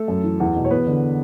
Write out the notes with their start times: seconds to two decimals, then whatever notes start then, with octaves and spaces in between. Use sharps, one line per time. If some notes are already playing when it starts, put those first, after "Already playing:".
Already playing: A3 A4
0.08 F#2
0.24 E3
0.40 E2
0.56 B2
0.65 C#5
0.71 E2 B3 B4
0.87 D3